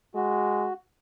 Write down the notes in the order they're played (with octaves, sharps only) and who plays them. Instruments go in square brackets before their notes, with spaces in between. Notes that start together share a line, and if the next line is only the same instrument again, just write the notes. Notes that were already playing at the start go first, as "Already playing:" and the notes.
[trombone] G#3 [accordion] F#4